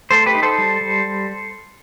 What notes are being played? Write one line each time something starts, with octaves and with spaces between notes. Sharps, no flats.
A3 A4 C5
G4 B4
D#4
A4 C5
G3
G3